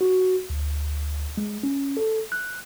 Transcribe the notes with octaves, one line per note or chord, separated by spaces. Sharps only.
F#4
D2
G#3
C#4
A4
F#6